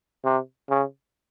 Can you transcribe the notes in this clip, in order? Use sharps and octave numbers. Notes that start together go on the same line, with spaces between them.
C3
C#3